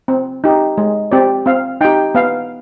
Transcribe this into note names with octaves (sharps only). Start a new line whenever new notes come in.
C4
D#4 G4
G#3
C4 G4 D5
C4 F5
D#4 G4 G5
B3 F5